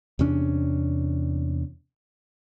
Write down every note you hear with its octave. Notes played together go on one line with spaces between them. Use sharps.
E2 C3 C#4 D4